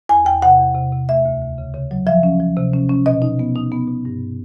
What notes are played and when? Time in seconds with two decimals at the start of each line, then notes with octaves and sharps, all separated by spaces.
0.09 E2 G#5
0.26 E2 G5
0.42 C3 F#5
0.59 E2
0.75 C3
0.92 C3
1.09 A3 E5
1.25 D2
1.41 D2
1.58 C#3
1.74 C#3
1.91 F#3
2.07 F3 E5
2.23 C#4
2.40 F3
2.57 C3
2.73 C#4
2.89 C#4
3.06 B2 D#5
3.22 D#4
3.39 B3
3.56 D#4
3.72 B3
3.88 B2
4.05 G2